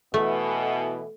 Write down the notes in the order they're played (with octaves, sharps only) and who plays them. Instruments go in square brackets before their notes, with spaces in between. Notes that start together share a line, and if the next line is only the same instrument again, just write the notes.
[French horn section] B2 E3 [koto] A3